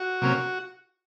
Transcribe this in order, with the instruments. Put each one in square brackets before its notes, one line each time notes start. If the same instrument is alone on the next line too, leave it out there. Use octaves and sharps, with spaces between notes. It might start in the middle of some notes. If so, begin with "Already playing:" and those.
Already playing: [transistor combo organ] F#4
C3 F#3 A#3 C#4